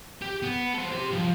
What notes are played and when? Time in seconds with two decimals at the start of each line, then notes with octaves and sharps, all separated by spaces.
0.22 G4
0.43 B3
0.74 A4 C5
0.92 G4 C6
1.12 F3 G3